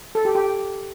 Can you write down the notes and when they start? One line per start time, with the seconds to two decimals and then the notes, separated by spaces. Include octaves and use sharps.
0.15 A4
0.25 G4
0.35 G4